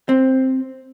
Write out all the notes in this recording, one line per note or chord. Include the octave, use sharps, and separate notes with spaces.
C4